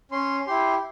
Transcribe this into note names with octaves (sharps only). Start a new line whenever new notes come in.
C#4 C6
E4 G4 C6